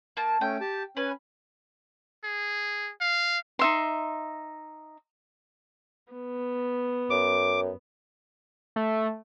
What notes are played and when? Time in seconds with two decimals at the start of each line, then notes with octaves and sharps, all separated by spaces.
0.17 A#3 A5
0.41 A3 C#4 G5
0.60 G4 A5
0.97 C#4 B4 G#5
2.24 G#4
3.01 F5
3.59 D#4 E5 C6
6.13 B3
7.10 F#2 D6
8.76 A3